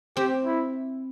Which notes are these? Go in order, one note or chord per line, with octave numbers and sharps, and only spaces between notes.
C4 G4
E4